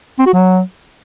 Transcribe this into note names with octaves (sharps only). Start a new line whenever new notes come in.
C4
F#4
F#3